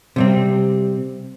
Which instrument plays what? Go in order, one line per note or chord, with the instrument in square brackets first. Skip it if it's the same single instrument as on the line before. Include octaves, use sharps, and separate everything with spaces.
[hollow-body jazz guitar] C3 G3 C4